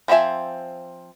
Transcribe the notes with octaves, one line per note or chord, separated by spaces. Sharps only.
F3 C4 F4 E5 G#5